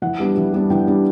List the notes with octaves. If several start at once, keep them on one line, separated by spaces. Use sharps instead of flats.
E3 F#5
G3 B3 D4
E3
G3 B3 D4
E3 G5
G3 B3 D4